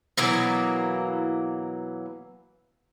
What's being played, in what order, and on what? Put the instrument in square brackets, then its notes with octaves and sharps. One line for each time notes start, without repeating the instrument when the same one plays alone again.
[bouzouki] B2 E3 F#3 A#3